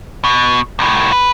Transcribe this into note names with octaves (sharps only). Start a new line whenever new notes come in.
B2
C2 A2
B4